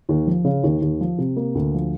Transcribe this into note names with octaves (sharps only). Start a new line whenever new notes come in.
D#2
F3
C#3
D#2
D#2
F3
C3
A#3
D2
F3